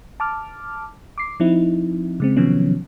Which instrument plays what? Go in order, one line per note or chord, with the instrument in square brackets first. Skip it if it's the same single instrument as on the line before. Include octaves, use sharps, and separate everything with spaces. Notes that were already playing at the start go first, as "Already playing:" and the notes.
[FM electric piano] A5 D6 F6
D6 C7
F3 C4 D#4 E4
C#3 G#3 C4
C3 D#3 F3 F#3 B3 C#4